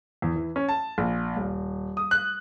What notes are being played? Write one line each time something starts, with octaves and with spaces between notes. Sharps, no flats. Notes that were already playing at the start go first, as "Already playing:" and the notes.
E2
E3
C#4
A5
A#1
D#1
D#6
F#6